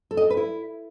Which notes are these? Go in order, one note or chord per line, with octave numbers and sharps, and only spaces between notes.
A4
D#5
A4
B4
E4